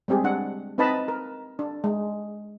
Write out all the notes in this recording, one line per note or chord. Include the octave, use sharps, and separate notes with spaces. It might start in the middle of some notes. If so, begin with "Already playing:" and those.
G3 G#3 C4 G4 G#4
D4 F#5
C4 D#4 B4 D#5 A5 B5
A#4
D4
G#3